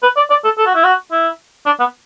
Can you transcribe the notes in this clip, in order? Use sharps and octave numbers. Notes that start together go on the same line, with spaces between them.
B4
D5
D5
A4
A4
F#4
E4
F#4
E4
D4
B3